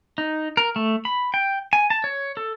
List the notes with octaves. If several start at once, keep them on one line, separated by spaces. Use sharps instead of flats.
D#4
A#4
A3
B5
G5
G#5
A5
C#5
A4